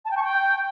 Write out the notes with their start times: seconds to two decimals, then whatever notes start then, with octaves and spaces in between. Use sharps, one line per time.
0.05 A5
0.11 G5
0.17 C#6
0.23 G5